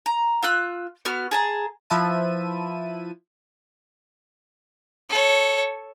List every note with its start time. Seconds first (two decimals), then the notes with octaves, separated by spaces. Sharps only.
0.06 A#5
0.43 F4 E6 F#6
1.05 B3 F#4 F6
1.31 G#4 A5 A#5
1.90 F3 E4 B4 E5 A5 D#7
5.09 A4 C#5